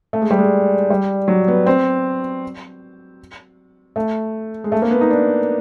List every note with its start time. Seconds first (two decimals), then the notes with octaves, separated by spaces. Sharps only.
0.13 A3
0.22 G#3
0.31 G3
0.38 G#3
0.90 G3
1.28 F#3
1.48 B3
1.66 C4
3.96 A3
4.64 G#3
4.72 A3
4.82 A#3
4.91 B3
5.01 D#4
5.11 D4